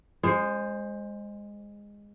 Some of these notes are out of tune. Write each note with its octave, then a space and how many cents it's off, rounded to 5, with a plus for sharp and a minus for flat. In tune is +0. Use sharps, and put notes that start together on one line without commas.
G#3 -15 C5 +15